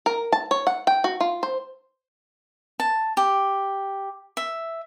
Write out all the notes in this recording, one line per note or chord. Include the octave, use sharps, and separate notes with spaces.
A#4
A5
C#5
F#5
G5
F#4
F4
C5
A5
G4
E5